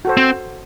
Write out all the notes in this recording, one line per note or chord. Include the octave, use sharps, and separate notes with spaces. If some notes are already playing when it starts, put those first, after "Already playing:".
F#4 A4 C5
C4